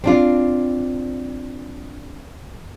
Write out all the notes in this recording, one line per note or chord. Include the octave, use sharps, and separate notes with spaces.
C4 D4 F4